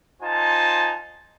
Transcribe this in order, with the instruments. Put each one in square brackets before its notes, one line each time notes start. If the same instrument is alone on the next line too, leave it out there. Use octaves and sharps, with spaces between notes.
[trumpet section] D#4 F4 C5 G#5 A5